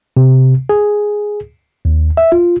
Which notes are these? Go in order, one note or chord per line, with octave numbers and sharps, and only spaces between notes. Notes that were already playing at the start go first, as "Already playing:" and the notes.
C3
G#4
D#2
E5
F4